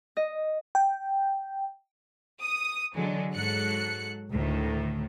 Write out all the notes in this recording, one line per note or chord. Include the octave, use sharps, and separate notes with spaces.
D#5
G5
D#6
D3 E3 F#3 G#3
G#2 F#3 A4 F#6 C#7
D2 A2 D#3